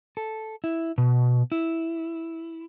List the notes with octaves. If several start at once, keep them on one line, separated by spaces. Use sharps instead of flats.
A4
E4
B2
E4